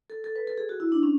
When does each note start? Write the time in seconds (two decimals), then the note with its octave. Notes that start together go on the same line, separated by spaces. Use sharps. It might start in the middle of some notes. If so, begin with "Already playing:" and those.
0.10 A4
0.24 A4
0.36 B4
0.47 A4
0.58 G#4
0.69 F#4
0.80 E4
0.92 D4
1.03 C#4